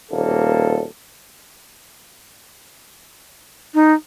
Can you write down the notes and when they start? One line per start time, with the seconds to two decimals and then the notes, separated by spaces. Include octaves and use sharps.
0.12 D#1 B2 A#3 A4
3.74 D#4